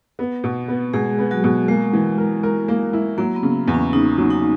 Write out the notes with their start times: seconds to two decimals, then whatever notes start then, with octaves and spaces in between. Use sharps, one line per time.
0.19 B3
0.44 B2
0.68 B3
0.93 B2 G#3 G#4
1.18 B3
1.31 F#3 F#4
1.44 B2
1.68 G#3 A#3
1.93 E3
2.18 A#4
2.43 A#4
2.68 A#3
2.93 E4
3.18 F#3 A#3
3.36 B3
3.43 C#3
3.68 E2
3.74 C#4
3.93 C#3 D#4
4.18 F#3
4.30 D#4